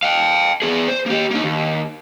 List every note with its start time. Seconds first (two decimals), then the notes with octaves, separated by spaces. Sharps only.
0.03 F5 G5
0.62 B3 G#4
0.88 C5
1.06 A#3 G4
1.31 A#3 D#4
1.44 D#2